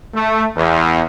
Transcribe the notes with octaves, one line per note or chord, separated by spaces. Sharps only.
A3
E2